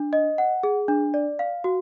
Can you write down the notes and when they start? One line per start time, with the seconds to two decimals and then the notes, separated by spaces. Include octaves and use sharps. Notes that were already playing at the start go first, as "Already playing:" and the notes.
Already playing: D4
0.13 D#5
0.38 F#5
0.63 G#4
0.88 D4
1.14 D5
1.39 F5
1.64 F#4